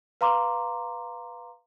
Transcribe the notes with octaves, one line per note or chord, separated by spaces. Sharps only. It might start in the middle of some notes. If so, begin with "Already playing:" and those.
B4 F5 A#5 C6 D6